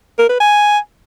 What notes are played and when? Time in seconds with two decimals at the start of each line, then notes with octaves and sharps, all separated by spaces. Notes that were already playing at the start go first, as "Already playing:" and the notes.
0.18 A#4
0.29 B4
0.40 G#5